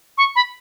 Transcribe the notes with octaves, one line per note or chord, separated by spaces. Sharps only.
C#6
B5